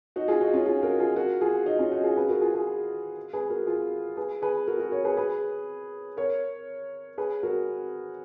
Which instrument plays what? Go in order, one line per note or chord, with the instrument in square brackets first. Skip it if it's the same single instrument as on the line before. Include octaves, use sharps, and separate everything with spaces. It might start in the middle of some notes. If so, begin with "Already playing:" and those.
[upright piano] D#4 F#4
F4 G#4
D#4 F#4
C#4 F4
F4 G#4
F#4 A#4
F4 G#4
F#4 A#4
F4 G#4
D#4 F#4
C#4 F4
D#4 F#4
F4 G#4
G#4 B4
F#4 A#4
F4 G#4
F4 G#4
G#4 B4
F#4 A#4
F4 G#4
G#4 B4
G#4 B4
F#4 A#4
F#4 A#4
A#4 C#5
G#4 B4
G#4 B4
A#4 C#5
G#4 B4
F#4 A#4